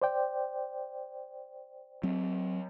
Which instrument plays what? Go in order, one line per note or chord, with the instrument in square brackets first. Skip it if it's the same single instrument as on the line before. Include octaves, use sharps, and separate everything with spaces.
[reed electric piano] C5 D5 G5
[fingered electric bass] F#3 C4